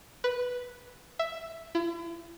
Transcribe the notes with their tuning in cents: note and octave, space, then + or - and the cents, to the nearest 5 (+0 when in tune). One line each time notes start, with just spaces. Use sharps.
B4 -5
E5 +5
E4 +40